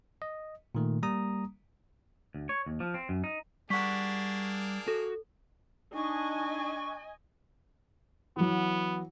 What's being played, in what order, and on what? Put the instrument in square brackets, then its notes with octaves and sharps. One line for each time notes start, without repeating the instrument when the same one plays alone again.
[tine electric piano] D#5
A#2 D#3 A3
G3 A#3 A#5 D#6
[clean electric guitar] D2
C#5
D#2
F3
C4
F#2
D#4
[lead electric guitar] G3 F#5 [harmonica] A#3 D4 G#4 [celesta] C#6 B6
[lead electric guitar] F#4 [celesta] A4
[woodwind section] D4 [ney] D#4 [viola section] D#5 G#5 [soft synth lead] C#6
[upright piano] E3 F#3 [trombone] B3